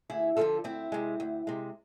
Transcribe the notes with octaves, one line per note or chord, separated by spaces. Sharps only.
D2 E4 G#4
D3 F3 G#3 F4 A4
D2 C4 E4
C3 G#3
D2
C3 G#3